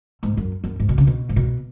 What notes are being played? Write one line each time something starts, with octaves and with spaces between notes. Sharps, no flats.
G#2
F#2
F#2
G#2
B2
C#3
B2
G#2
B2